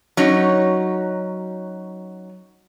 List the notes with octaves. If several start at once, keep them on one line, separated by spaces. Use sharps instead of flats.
F#3 C#4 D#4